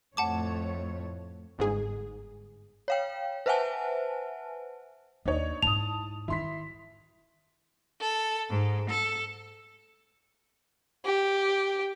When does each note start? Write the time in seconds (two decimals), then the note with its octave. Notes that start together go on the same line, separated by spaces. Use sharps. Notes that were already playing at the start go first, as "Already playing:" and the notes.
0.17 F2 A2 A3 C#5 F#5 A5 D6
1.58 G1 G#2 G#4
2.88 C#5 F5 G5
3.46 B4 C5 E5 F#5 G#5 A5
5.25 D#2 D4 D#4 C#5
5.63 G#2 E4 A5 D#6 F7
6.28 D#3 E3 E4 C6 B6
8.00 A4
8.49 G#2
8.90 A4
11.05 G4